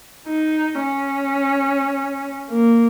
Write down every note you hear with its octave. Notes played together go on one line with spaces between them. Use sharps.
D#4
C#4
A#3